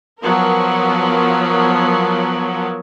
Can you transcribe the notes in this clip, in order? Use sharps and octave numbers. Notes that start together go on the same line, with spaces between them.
F3 F#3 B3 A#4